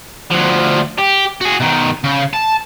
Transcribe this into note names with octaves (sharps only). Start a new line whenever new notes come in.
D2 F3
G4
F#4 G#4
B2 D#3
C#3
A5